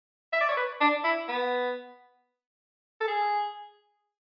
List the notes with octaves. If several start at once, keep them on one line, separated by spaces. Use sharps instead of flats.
E5
D5
C#5
B4
D4
E4
B3
A4
G#4